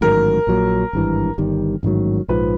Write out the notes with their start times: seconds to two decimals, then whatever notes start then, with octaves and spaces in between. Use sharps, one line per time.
0.01 A1 G#2 D#3 F#3 A#4
0.47 A#1 A#2 F#3 A#3
0.93 G#1 G2 E3
1.38 G1 G2 D#3 G3
1.83 A1 G#2 D#3 F#3
2.28 A#1 G#2 F3 B4